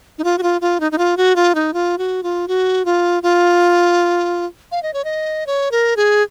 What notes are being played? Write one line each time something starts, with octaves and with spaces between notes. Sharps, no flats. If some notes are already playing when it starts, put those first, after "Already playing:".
D#4
F4
F#4
F4
F4
D#4
D#4
F4
F#4
F4
D#4
F4
F#4
F4
F#4
F4
F4
F5
D#5
C#5
D#5
C#5
A#4
G#4